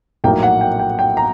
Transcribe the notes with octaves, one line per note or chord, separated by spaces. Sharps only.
A#1 A2 F#3 A#3 D#4 G5
F#5
G5
G5
G5
A#5